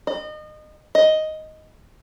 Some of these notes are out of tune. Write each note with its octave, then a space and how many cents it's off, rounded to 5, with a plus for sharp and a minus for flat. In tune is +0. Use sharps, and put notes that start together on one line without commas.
D#5 -30
D#5 +5